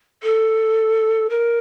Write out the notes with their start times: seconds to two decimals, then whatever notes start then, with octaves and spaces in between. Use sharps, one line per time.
0.23 A4
1.30 A#4